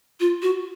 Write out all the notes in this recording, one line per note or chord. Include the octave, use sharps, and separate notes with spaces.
F4
F#4